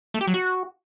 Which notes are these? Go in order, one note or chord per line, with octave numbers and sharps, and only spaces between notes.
A3
G4
F#3
F#4